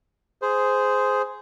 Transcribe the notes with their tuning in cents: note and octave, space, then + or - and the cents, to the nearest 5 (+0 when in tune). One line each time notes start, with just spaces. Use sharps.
G#4 +5 C5 -10